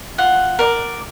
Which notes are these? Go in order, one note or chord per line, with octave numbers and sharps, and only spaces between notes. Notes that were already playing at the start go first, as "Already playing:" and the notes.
F4 F#5
A#4 D5